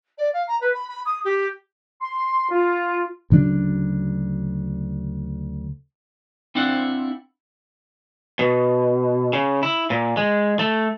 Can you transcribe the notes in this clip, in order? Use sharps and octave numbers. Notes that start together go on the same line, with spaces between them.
D5
F5
A#5
B4
B5
B5
D#6
G4
C6
F4
D2 C#3 F#3 D4
C4 D4 E4 C5 F5 F#5
B2
C#3
E4
A#2
G#3
A3